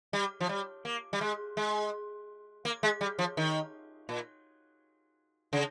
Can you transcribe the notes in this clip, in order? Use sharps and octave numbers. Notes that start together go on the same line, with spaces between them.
G3
F3
G3
A#3
G3
G#3
G#3
A#3
G#3
G3
F3
D#3
A#2
C#3